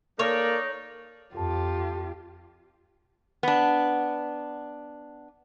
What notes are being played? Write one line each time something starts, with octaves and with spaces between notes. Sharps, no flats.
A#3 D#4 A4 A#4 C#5 D5
F2 F4 G4 A4 A5
B3 D4